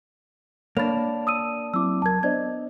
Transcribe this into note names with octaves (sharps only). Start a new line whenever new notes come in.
A#3 D4 C#5 B5 A6 F7
D#6 E6 D#7
F#3 C4 E4 D6 E6
C#2 F#3 A#4 A5 G#6
B3 D4 C5 D5 D#5 G#6